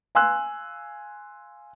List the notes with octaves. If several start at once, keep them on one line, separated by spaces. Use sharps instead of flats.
F5 G#5 C6 E6 F#6